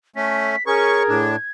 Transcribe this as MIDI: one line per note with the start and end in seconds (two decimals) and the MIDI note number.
0.16 0.56 57
0.16 0.56 61
0.16 0.66 95
0.67 1.03 61
0.67 1.25 68
0.67 1.22 70
0.67 1.03 85
0.67 1.52 92
1.09 1.36 45
1.09 1.36 62